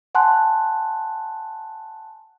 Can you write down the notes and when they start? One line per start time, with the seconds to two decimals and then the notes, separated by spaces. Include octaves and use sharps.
0.15 F#5 G#5 A5 C6 F#6